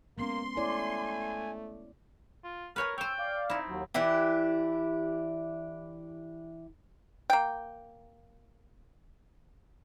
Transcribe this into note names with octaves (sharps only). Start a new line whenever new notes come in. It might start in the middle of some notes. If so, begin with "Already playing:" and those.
G#3 A#3 B3 C#4 C6
A3 E4 C#5 D5 G#5
F4
A#4 B4 C#5 G#5 F6
C5 C#5 G5 E6
D5 F5
C4 D#4 E4
D#2 F#3
E3 D4 E4 G4
A#3 G5